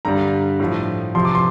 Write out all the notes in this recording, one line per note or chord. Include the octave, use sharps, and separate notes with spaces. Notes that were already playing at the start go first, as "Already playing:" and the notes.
G2 D3 G3 A#5
A2 F3
F2 C3 F3 C6
D6
C6